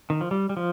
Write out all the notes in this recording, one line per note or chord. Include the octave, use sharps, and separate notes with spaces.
D#3
F3
G3
G3
F3